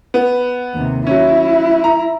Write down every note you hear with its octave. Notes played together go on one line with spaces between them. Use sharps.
B3
D#2 C3
F#3 C#4 E4
A#5